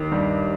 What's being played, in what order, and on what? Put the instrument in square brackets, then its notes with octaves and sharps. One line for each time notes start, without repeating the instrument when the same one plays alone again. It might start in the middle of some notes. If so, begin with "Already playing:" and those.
Already playing: [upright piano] D#2 D#3
G2 G3